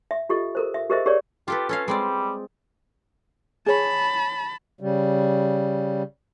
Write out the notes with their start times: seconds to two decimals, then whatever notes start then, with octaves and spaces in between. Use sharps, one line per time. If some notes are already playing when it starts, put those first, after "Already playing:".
0.11 E5
0.29 F4 G4 A4 D#5
0.55 A4 A#4 C5
0.74 E5
0.90 G4 G#4 A#4 C5 D#5 E5
1.06 G4 G#4 A#4 C#5 D5
1.48 F4 G4 A4 B4
1.69 C#4 A4 C#5 F5
1.88 G3 G#3 C4 D5
3.66 G#4 C#5 A5 B5
4.80 C#3 G3